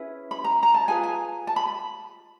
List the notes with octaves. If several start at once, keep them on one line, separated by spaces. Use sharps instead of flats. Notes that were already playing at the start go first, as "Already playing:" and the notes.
Already playing: C#4 E4 G#4 B4
B5
A#5
A#5
A5
F4 G#4 B4 G#5
G#5
A5
B5